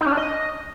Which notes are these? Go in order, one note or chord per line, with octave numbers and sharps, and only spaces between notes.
D#4
C#4
D4
D#5